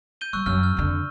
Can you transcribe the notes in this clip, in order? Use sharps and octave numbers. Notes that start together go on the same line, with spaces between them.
G6 D#7 G7
G3 C#6 E6 F#6
F#2 E6 F6
F6
F2 D3